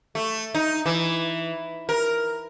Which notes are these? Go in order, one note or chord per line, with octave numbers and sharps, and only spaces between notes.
A3
D#4
E3
A#4